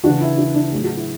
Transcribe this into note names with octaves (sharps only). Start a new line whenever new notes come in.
C#3 E3 D4 F#4
E4
D4 F#4
D4
A2 F#3 G#4
F#4
E4